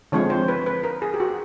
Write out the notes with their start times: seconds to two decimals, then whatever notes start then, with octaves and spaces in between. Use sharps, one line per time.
0.12 D3 F3 G#3 C4 C#5
0.30 C5
0.48 B4
0.66 B4
0.83 A#4
1.02 G#4
1.14 G4
1.20 F#4